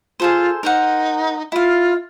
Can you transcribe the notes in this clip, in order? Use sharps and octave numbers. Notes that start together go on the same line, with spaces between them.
F4 G#4 A4 C5
D#4 A#4 C5 F#5
E4 F4 F5